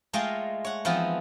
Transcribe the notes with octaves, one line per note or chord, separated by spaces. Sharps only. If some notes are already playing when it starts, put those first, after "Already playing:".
G#3 A3 F4 D#5 F5 G5
C#5 F#5
E3 F3 B3 C4 D#4 F4